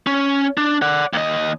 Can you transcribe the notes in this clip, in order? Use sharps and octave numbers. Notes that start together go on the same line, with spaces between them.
C#4
D4
D5 F#5
D#2 D#5